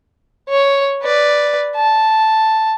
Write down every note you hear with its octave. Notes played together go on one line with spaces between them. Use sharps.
C#5
B4 D5
A5